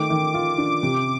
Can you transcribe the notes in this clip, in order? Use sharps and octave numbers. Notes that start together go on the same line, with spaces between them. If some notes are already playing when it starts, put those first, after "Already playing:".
Already playing: D#3 A3 D6
D#3
F4
D4
C3 D6